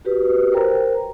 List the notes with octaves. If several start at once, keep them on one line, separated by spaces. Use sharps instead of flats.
F#4 G4 B4
A#4 C5 G5 A#5